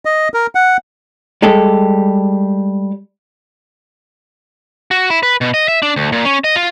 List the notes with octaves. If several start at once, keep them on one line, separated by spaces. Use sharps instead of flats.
D#5
A#4
F#5
G3 G#3 G4 A4
F#4
E4
B4
B2
D#5
E5
D4
D2
A#2
C#4
D#5
F4